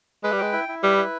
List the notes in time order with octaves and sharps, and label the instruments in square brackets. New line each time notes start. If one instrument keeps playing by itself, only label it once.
[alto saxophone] G#3 [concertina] B4
[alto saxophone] G3
[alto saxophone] G#3 [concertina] G5
[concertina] E4
E4
[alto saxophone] G3 [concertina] B4
[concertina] E4